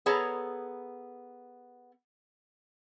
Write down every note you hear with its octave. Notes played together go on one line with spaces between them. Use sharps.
B3 G#4 A4 C#5 A5 A#5